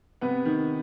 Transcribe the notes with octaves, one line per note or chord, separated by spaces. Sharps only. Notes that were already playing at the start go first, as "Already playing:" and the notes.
C3 B3 B4
D#3